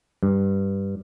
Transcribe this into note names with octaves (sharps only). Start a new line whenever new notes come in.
G2